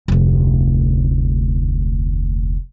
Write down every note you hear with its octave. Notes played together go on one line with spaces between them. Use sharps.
F1 D2